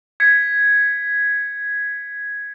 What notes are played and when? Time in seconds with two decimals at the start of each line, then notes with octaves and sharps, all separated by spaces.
0.20 G#6 B6 C#7